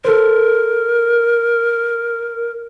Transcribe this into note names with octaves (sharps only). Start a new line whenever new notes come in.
A4 A#4 C5